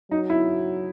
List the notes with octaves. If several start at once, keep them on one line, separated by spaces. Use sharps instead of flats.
F#3 D#4
E4